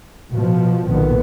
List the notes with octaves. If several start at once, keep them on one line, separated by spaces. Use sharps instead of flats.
B2 F3
B1 A#2 D3 D#3 B3